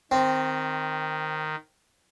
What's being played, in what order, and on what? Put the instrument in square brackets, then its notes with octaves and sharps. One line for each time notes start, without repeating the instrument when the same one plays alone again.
[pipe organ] D#3 [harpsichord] C4